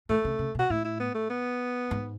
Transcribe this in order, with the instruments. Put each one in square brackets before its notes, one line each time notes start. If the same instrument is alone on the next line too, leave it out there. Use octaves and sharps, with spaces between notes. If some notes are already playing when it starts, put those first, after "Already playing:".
[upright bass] A2 [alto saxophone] A3
[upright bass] C#3
C#3
B2
[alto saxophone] F#4
[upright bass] A2 [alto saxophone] E4
[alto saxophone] E4
B3
A3
B3
[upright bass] G#2